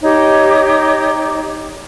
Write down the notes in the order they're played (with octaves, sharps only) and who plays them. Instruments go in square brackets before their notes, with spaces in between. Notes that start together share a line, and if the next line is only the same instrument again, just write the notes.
[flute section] D#4 G4 C#5